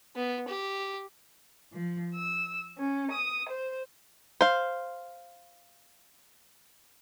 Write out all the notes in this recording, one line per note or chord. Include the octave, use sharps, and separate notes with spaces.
B3
G4
F3
E6
C#4
D#6
C5
C5 F5